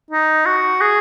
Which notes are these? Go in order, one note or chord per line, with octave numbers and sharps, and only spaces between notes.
D#4
F#4
G#4